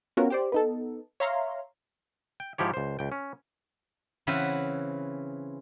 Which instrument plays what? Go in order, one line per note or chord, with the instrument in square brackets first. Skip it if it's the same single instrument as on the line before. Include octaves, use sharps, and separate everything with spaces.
[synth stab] B3 C#4 F4 F#4 A#4
G4 C5 D5
B3 D#4 A4
C#5 E5 F5 A#5 C6
[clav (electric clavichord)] G5
G#2 F3 E4 G4 C#5
C#2 C5
C#2 G5
C#4
[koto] C#3 E3 C4 C#4 B4 F#5